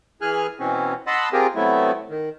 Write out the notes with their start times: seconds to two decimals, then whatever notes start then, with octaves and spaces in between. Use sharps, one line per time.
0.21 E3 G#4 G#5 F6 F#6
0.60 B2 E3 C4 C#4
1.07 D#5 F#5 A5 B5 C6 E6
1.33 C4 F4 G4 G#4 A#4
1.56 C3 F#3 A3 B3 E4
2.09 D#3